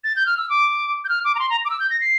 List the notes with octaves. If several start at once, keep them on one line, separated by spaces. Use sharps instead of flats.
A6
G6
F6
E6
D6
G6
F6
D6
A#5
C6
A#5
D6
E6
G6
A#6
C7